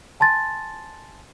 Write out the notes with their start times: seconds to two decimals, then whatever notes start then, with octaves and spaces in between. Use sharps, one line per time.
0.20 G#5 A5 C6 A6